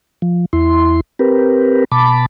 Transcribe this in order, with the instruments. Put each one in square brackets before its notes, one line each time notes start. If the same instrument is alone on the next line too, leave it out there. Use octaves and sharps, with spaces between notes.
[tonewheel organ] F3
E2 E4 C6
C4 G4 A#4 B4
B2 A5 B5 D6